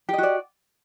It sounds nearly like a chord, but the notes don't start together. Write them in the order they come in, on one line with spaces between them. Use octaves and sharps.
G4 D#5 F#4 D5